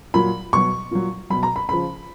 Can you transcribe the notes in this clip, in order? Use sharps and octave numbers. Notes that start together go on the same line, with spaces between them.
A#2 F#3 B5
B2 F#3 C#6
A#2 F#3
B2 F#3 B5
A#5
B5
C#3 F3 B5